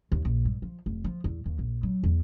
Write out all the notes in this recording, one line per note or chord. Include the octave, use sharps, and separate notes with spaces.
D#2
A#1
G2
F3
F1
F3
E2
D#2
A#1
F#3
E2